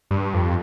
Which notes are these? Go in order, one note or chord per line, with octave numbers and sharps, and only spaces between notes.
G2
F2